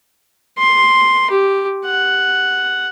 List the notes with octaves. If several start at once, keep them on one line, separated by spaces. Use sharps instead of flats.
C6
G4
F#5